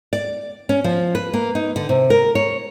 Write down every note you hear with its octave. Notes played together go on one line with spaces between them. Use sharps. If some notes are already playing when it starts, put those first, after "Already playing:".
D5
C#4
F3
B4
A#3
D#4
D3
C3
A#4
C#5